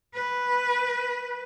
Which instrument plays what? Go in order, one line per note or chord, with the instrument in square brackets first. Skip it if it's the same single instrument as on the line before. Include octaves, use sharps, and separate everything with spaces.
[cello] B4